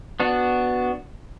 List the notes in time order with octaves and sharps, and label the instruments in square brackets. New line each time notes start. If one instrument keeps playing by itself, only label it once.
[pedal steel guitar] B3 D4 F#4